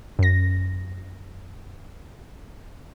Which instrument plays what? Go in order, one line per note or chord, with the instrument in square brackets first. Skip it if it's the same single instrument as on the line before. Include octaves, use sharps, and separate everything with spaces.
[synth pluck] F#2 A#6